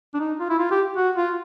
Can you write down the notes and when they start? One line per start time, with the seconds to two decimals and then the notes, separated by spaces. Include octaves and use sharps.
0.14 D4
0.20 D#4
0.40 F4
0.50 E4
0.59 F4
0.72 G4
0.97 F#4
1.16 F4